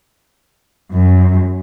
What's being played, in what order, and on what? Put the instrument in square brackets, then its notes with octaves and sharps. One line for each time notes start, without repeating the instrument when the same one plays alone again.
[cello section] F#2